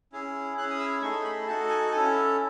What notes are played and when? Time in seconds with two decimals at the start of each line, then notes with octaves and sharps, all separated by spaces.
0.13 C#4 E4 G#4
0.57 C#4 E4 G#4 F#6
0.70 D#6
0.79 E6
1.02 A3 D#4 G#4 C#6
1.24 B5
1.47 D#4 F#4 A4 A5
1.70 G#5
1.91 C#4 E4 A4 G#5